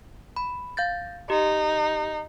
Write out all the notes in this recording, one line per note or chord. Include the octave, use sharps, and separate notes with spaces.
B5
F5 G6 A6
D#4 G4